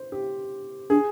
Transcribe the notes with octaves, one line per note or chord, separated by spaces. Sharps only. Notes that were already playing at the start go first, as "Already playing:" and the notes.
Already playing: C5
G4
D4 G#4